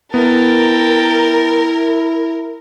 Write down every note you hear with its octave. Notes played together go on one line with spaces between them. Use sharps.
B3 E4 A#4 G5 A5